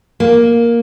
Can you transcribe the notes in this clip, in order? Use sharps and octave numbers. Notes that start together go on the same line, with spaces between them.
A#3